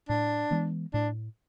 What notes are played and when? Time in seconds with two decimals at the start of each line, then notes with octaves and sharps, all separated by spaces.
0.09 A2 D4
0.51 E3 G#3 B3
0.94 A2 D4